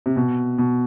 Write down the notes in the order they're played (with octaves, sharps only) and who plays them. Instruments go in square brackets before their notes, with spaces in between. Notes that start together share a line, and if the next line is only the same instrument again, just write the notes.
[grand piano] C3
B2
B2